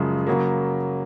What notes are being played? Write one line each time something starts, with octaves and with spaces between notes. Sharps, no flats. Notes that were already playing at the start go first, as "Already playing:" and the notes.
Already playing: F#2 C#3 F3 G#3
C#3 F#3 A#3